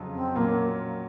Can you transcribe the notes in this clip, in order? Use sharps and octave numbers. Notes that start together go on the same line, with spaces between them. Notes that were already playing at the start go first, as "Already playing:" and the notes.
Already playing: F2 C#3 F#3
C4
A#2 F#3 A#3 C#4 F#4